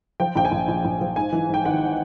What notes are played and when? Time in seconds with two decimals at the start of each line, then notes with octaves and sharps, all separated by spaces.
0.20 F3 G5
0.36 A#1 G5
0.45 G#5
0.52 A#1
0.68 A#1
0.84 A#1
1.01 F3
1.16 G#2 G#5
1.33 E3
1.49 G#2 G5
1.65 G#1 F#5